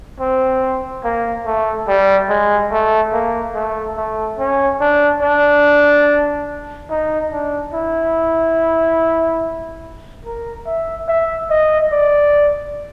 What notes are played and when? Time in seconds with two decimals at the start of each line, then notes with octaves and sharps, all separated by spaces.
0.20 C4
1.04 A#3
1.46 A3
1.88 G3
2.29 G#3
2.72 A3
3.13 A#3
3.55 A3
3.97 A3
4.39 C#4
4.81 D4
5.22 D4
6.90 D#4
7.32 D4
7.74 E4
10.25 A#4
10.67 E5
11.08 E5
11.50 D#5
11.92 D5